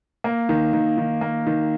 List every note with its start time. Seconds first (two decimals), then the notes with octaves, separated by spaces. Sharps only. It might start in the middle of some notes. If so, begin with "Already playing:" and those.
0.24 A#3
0.49 D#3
0.73 D#3
0.98 D#3
1.21 A#3
1.47 D#3